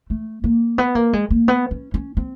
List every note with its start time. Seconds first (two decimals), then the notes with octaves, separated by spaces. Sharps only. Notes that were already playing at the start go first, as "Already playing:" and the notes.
0.10 A3
0.44 A#3
0.78 B3
0.95 A#3
1.13 G#3
1.30 A#3
1.48 B3
1.71 C#4
1.94 C#4
2.17 C4